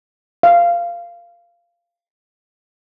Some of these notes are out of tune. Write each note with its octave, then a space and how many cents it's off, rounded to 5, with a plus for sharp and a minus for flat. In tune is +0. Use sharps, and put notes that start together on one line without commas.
F5 -15